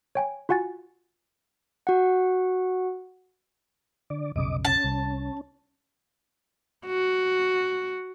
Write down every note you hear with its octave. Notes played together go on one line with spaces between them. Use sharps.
C#5 G5 G#5
F4 F#4 F#5 G#5 A6
F#4 F#5
D3 D5
F1 B1 C#3 D#5 D6
C#4 A5
C2
F#4